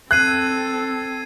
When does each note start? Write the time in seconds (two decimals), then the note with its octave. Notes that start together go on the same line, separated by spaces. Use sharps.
0.11 C4 A4 F#6 G#6 C7 D#7